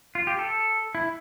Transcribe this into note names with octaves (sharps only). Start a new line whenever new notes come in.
F4
G4
A4
E4